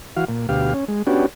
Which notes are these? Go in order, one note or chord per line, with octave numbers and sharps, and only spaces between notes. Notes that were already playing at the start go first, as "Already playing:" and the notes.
E3 F#4 F5
A#2
D2 B2 G4 F5
C#4
G#3
B3 C#4 D4 F#4 G4